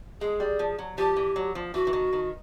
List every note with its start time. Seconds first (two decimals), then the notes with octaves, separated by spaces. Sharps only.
0.21 G#3 G#4
0.40 G3
0.59 F3
0.78 F#3
0.98 F3 G4
1.17 E3
1.36 F#3
1.55 F3
1.74 E3 F#4
1.87 E3
1.93 D#3
2.13 D#3